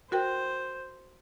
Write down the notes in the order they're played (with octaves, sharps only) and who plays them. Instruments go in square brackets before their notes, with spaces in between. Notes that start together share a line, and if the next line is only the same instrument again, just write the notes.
[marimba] F#4 A#4 G5 [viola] C5